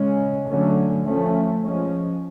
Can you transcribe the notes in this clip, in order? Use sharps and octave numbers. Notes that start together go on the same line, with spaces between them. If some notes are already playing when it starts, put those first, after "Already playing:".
Already playing: C#3 G#3 C#4
D3 F#3 A3 C#4
F3 A3 C#4
F3 G#3 C#4